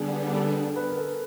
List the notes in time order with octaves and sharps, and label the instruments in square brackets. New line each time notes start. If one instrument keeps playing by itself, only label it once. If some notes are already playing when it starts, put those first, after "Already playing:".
Already playing: [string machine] D3 G3 B3 D4 [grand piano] G#4
[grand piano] A4
B4
A#4
A4